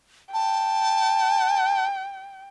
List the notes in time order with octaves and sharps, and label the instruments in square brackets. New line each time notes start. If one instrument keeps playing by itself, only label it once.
[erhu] G5 [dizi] A5